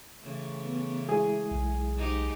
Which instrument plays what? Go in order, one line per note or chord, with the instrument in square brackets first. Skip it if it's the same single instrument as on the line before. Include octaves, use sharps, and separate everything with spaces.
[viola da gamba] C#3 E3 A3
[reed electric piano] B3
[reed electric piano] G#3 E4 [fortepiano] G#4
[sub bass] B1
[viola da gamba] G#2 D#4 G4